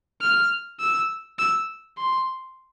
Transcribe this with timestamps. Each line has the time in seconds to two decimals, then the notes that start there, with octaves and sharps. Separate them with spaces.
0.21 F6
0.80 E6
1.39 E6
1.97 C6